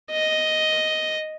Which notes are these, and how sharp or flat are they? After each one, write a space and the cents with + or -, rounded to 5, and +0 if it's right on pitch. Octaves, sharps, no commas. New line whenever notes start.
D#5 +0